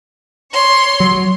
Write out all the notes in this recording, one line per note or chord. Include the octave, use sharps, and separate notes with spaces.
C#5 C6
F#3